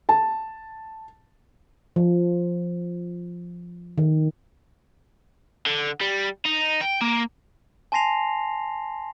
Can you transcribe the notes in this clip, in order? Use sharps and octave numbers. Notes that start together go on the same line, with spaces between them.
A5
F3
D#3
D3
G3
D#4
G5
A#3
G#5 A5 C6 A#6 C7 F7